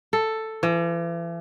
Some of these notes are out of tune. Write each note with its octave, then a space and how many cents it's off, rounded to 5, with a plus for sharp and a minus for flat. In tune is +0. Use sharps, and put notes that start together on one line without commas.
A4 +5
E3 +40